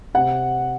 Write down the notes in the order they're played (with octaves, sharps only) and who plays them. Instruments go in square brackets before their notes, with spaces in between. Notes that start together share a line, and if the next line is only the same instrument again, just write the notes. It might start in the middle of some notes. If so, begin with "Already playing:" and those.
[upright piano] C3 F#5